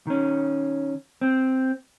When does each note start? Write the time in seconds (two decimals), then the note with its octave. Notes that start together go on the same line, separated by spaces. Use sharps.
0.07 D#3 C#4
1.21 C4